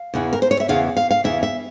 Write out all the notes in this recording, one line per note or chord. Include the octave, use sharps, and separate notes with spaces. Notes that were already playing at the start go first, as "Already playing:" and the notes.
Already playing: F5
E2 C#3 E3
A#4
C5
C#5
E5
E2 C#3 E3 F5
F5
F5
E2 C#3 E3 E5
E5